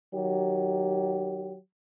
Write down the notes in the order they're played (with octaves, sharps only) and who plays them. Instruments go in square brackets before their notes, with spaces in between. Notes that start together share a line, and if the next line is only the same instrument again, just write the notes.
[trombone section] D#3 F#3 G4